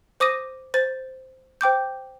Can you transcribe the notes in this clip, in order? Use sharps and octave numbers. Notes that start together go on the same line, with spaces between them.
C5 D6 D#6 A#6 D#7
C5 A6
C5 G5 D6 G6